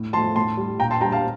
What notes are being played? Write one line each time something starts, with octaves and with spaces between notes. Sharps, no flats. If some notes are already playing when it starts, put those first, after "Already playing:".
Already playing: A2
F3 A3 A5 C6
A2 A5 C6
G3
A#2 G5 A#5
A5 C6
G3 G5 A#5
F5 A5